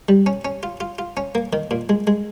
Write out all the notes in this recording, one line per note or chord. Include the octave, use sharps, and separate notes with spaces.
G3
C#4
C#4
F4
F4
F4
C#4
A#3
D#3
A#2
G#3
G#3